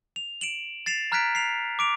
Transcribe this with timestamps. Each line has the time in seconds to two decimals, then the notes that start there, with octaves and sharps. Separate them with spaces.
0.16 F7
0.41 D7 E7 F#7
0.86 A6 C7 E7 F7
1.12 A#5 F6 F#6 G#6 B6 D7
1.35 C7 F7
1.79 D6 D7 F7